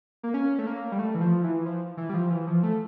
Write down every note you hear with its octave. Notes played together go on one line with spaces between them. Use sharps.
A#3
C#4
A3
A#3
G3
A3
E3
F3
E3
F3
E3
G3
F3
E3
F3
A3